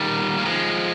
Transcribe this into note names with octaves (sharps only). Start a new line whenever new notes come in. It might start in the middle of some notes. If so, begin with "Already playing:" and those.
Already playing: D#3 G3
A#3
F3 G#3